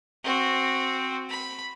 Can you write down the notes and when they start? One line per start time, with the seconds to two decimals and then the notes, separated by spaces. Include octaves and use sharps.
0.24 C4 F#4
1.30 B5